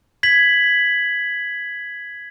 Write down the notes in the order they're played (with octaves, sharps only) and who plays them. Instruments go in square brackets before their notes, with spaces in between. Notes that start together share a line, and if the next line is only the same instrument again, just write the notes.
[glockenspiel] G#6 B6 F#7